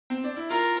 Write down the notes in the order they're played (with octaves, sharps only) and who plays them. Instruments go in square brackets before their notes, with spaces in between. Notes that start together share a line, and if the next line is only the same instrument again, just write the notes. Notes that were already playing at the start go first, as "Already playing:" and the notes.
[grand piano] C4
D4
E4
[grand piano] F4 [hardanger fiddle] A#4